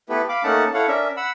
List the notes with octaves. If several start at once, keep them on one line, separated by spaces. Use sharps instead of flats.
A3 B3 E4 G4 A4 B4
F5 B5 D6
A3 A#3 C#4 D#4 F#5 A5
E4 A4 C#5 F5 F#5
C#4 D4 A#4 E5
F#5 B5 E6